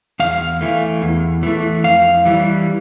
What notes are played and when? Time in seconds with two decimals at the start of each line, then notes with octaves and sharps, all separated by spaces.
0.20 E2 F5
0.61 E3 A3
1.02 E2
1.43 E3 A3
1.84 F2 F5
2.26 E3 G3